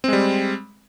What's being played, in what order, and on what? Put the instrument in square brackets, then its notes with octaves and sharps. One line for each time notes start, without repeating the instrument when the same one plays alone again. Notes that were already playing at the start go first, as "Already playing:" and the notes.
[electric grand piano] C4
G#3
G3